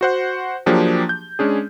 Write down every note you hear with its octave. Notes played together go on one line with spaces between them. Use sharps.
F#4 C5 F#5
F3 F#3 A#3 D4 G4 G#4
G6
G#3 C#4 D4 G#4